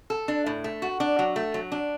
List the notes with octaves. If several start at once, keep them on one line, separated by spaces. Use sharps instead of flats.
A4
D4
A2
A3
F#4
D4
F#3
A3
F#3
D4